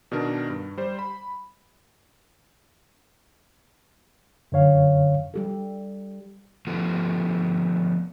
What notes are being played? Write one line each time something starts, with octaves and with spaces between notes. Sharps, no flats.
B2 D#3 D4 A#4
G2
G3 C5
B5
F#2 D3 C#5 F5
G3 G4 A4
F3 A3 B3